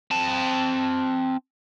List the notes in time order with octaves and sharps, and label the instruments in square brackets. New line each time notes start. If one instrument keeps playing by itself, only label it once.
[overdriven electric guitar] C4 A5